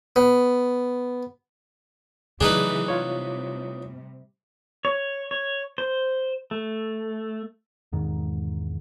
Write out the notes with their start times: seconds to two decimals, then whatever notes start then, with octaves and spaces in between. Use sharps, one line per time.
0.16 B3
2.41 A2 C#3 E3 F#3 D4 D#4 G#4 B4
2.88 C3 G3 F4 C#5
4.85 C#5
5.31 C#5
5.78 C5
6.51 A3
7.92 E1 G#2 D#3